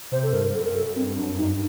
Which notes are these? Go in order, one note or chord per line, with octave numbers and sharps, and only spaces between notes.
C3 C5
A4
G2 A#4
G2
F#2 A4
A#4
G2
F#2 A4
G2 C4
F#2 D4
G2 D#4